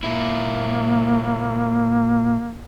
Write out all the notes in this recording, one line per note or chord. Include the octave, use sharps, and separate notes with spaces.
A#2 A#3 E4